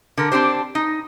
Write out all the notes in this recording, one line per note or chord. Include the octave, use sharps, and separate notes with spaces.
D3 A#4
C4 D4 G4 C5
D#4